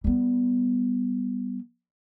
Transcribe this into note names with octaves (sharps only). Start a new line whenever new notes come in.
G3 B3